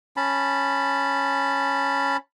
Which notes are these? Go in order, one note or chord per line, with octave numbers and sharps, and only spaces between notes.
C#4 A5 B5